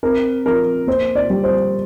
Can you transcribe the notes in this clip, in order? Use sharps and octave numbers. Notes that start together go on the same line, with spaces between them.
C4 A#4
F3 A#4
A#3 C5
D5
G3
C5